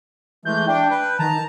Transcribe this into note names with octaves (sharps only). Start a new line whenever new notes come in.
E3 G#3 A3 G6
D4 G5
B4
D#3 A5 A#5